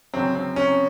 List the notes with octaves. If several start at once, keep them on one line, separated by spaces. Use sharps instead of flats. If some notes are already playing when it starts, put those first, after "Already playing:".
G1 F#2 C#3 F#3 C4
C4
C#4